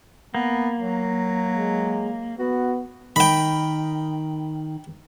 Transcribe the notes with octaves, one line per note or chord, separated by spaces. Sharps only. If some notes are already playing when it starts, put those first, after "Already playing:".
A#3 B3
F#3
G#3
B3 F#4
D#3 G5 B5